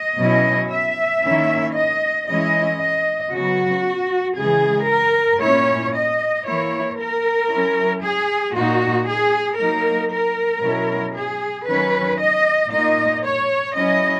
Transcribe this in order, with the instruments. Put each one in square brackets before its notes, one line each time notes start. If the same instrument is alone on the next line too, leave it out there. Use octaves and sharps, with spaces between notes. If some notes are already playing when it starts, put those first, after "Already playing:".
Already playing: [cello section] D#5
B2 F#3 C#4 E4
E5
D#3 A#3 C#4 E4
D#5
E3 G#3 C#4 E4 D#5
D#5
C#3 F#3 B3 F#4
C#3 E3 G#3 G#4
A#4
A#2 A#3 C#4 E4 C#5
D#5
E3 A#3 E4 C#5
A#4
F#3 C#4 E4
G#4
A#2 A#3 D#4 F#4
G#4
F#3 A#3 D#4 A#4
A#4
B2 F#3 C#4 E4
G#4
D#3 F#3 C#4 B4
D#5
A#2 A#3 D#4 D#5
C#5
F#3 C#4 E4 D#5